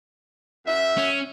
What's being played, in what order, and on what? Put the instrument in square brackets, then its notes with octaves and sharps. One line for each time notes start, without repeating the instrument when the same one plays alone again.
[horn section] F#2 E5
[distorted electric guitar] C#4